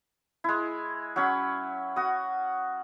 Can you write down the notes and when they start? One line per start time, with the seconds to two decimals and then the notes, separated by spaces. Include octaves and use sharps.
0.44 G#3 E4
1.16 F#3 C#4 B5
1.96 F#4 D#6